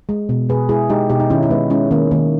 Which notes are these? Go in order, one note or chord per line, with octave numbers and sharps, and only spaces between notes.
G#3
B2
B2 G#4 B4
G#3 E4 G#4
G#3 D#4 G4
B2 D#4 G4
D#4
D#3 C#4 E4
E4
G#3 B3 D#4
G#3 C#4 E4
D#3 A#3 C#4
D#3 A#3